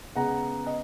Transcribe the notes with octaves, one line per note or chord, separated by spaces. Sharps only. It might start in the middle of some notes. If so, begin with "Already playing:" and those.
C#3 G#3 B3 F#5 A#5
D#5